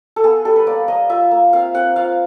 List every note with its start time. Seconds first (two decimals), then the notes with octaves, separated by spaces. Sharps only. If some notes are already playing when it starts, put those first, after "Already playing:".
0.16 A4
0.24 B3 G#4
0.45 G3 A4
0.56 B4
0.67 A#3 D5
0.88 A#3 D#5
1.10 F4 E5
1.31 A#3
1.53 C4 F5
1.74 C4 F#5
1.96 F4 F5